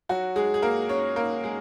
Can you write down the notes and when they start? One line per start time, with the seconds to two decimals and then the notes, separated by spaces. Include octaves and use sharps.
0.09 F#3 F#4
0.36 G#3 G#4
0.54 G#4
0.62 A#3 A#4
0.89 C#4 C#5
1.16 A#3 A#4
1.44 G#3 G#4